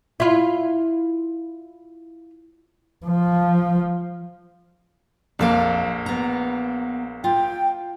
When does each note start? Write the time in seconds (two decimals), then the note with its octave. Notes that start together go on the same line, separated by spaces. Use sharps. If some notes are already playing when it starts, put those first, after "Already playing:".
0.20 E4 F4
3.06 F3
5.39 A#1 F2 A#3 A4 F5
6.06 B3 A#5
7.24 F4 G5